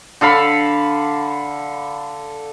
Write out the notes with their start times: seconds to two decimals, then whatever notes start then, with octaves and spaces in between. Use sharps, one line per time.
0.21 D3 A4 F5 B5